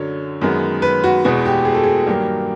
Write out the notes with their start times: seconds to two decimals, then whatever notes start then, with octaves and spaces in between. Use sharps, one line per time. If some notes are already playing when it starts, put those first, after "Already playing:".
Already playing: F#2 D3 F#3 C#5
0.42 F#2 D#3 G#3 B3
0.82 B4
1.04 F#4
1.25 E2 B2 G#3 B3 F#4
1.45 G4
1.65 G#4
1.75 A4
1.84 G#4
2.07 G2 D#3 F#3 A#3 G4